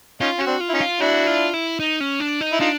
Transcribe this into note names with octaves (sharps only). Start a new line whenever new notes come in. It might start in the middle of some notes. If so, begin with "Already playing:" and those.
C#4 D#4 F4
C#4 F#4
C4 D4
F4
E4
C#4 D#4
F4
D4 E4 F#4
F4
E4
D#4
C#4
D4
D#4
E4
D4 D#4 F4